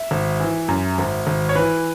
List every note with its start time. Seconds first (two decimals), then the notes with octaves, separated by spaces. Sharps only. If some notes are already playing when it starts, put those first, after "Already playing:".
Already playing: E5
0.11 G#1
0.40 E3
0.68 F#2
0.98 G#1
1.27 G#1
1.49 C#5
1.55 E3 B4